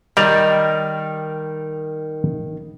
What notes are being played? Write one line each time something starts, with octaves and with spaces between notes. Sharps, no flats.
D#3 G3 D5 A#5